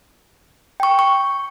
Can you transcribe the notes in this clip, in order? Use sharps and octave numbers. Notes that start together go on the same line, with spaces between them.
G5 C#6
C#6